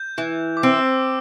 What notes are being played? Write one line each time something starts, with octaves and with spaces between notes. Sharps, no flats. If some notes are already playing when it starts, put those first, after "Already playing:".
Already playing: G6
E3
D6
C4 E6